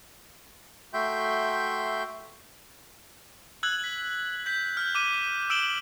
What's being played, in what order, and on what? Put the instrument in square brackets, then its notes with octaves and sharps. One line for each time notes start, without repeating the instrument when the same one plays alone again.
[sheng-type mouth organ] A3 F#4 E5 G5 C6 G6
[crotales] E6 F#6 G#6 F#7
B6
G6 B6
F6 G6
D6 D#7
E6 D7 E7 F#7 G7